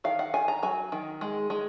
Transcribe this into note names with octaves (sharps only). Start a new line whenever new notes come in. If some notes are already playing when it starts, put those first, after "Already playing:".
D#3 F5
F#5
D#3 G#5
A#5
F#3 G#5
D#3
G#3
G#3